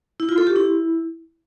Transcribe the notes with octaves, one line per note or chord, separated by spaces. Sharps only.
E4
F4
A4
G4
E4